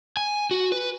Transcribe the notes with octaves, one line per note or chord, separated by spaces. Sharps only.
G#5
F#4
B4